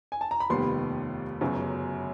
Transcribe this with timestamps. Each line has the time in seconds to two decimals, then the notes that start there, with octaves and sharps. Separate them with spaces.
0.12 G#5
0.21 A5
0.31 A#5
0.40 B5
0.49 F1 D#2 D#3 G3 B3 C6
1.41 G1 F#2 C#3 F#3